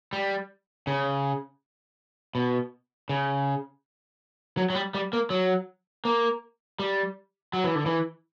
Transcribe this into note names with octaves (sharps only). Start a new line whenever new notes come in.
G3
C#3
B2
C#3
F#3
F#3
G3
G3
A#3
F#3
A#3
G3
F#3
E3
D3
E3